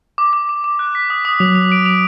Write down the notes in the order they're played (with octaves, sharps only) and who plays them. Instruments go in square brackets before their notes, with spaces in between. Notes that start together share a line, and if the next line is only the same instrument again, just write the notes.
[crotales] D6
D6
D6
D6
F#6
B6
D#6
D#6
[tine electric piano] F#3 [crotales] F7
[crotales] F7
D7
F7